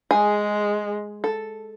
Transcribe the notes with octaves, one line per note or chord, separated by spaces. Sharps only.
G#3 G#4
A4